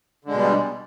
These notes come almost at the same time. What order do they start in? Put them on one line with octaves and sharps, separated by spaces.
D3 G#3 B2 G3